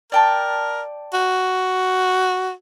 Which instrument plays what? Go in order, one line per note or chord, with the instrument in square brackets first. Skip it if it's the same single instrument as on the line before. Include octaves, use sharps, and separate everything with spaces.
[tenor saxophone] A#4 [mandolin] D5 G5 A5
[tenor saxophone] F#4